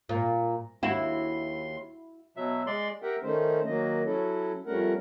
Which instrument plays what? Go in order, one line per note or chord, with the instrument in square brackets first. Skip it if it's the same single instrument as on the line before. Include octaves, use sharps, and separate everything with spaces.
[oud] A#2
[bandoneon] D#2 C6 [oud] E4 F#4
[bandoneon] B2 F#3 E5
G#3 D5 C6
[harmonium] G4 A#4 E5 F#5 G5
D#3 A3 C#4 D#4 C5
D#3 F#3 A#3 D#5
F#3 C#4 E4 A4
F2 G3 A3 C#4 A#4 F#5